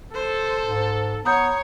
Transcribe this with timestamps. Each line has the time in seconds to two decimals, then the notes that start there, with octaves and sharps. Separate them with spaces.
0.14 A4 C5
0.64 G#2
1.25 B3 C#5 A#5 D#6 G6